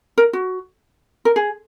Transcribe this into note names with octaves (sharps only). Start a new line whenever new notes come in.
A#4
F#4
A#4
G#4